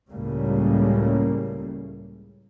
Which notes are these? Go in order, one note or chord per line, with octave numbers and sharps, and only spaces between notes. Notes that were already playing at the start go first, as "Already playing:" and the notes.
C#2 A2 C#3 G3 A#3